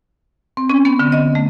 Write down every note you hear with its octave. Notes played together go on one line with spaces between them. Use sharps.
C4
C#4
B3
D3
D#5
A3